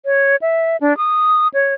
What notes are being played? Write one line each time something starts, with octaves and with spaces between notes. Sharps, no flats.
C#5
E5
D4
D#6
C#5